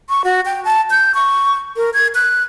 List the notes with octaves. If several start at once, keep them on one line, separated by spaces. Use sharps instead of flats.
C#6
F#4
G5
A5
G6
C#6
A#4
G#6
F#6